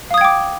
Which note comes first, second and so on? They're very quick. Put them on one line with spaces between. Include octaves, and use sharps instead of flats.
F5 D#6 G#6 G5 D6